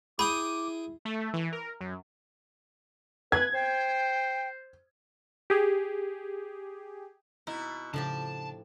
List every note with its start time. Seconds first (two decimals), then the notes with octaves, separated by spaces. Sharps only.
0.19 E4 G#4 G5 B5 D6 D#6
1.05 A3
1.34 E3
1.52 A#4
1.81 F#2
3.32 B4 G#6
3.54 C5 G5
5.50 G4 G#4
7.47 B2 D#4 E4
7.94 A2 C#3 F3 D4 G4 A5